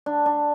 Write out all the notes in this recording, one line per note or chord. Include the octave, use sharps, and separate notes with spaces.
D4
D4